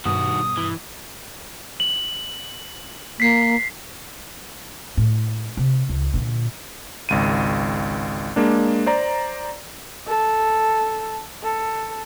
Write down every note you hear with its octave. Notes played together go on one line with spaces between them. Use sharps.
G2 B2 D#3 F#4 D#6
E3
F#7
A#3 B6 C7
A2
C3
C#2
A#2 D3
G#1 C#2 D#7
G#3 A#3 D4
C5 D5 A#5
A4
A4